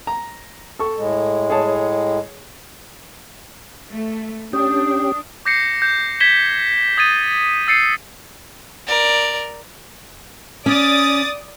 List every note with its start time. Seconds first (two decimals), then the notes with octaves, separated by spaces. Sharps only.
0.07 A#5
0.79 A4 C#6
0.98 A2 G#3
1.50 G#4 C#5 A5
3.91 A3
4.53 C#4 D4 G4 D#6
5.45 D6 G6 A#6 C7 C#7
5.82 G6
6.20 G#6 B6 E7 G7
6.98 D#6 G#6 A6 D#7
7.68 E6 A6 C7 C#7 D#7
8.87 A#4 D5
10.66 C#4 D5 D#6 A6